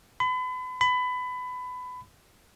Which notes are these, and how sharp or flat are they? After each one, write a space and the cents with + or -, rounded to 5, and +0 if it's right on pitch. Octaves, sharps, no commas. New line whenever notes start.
B5 +35
B5 +20